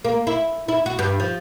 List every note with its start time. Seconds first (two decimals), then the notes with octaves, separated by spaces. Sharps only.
0.05 A#3
0.27 E4
0.68 E4
0.86 F#4
0.99 G2
1.20 F3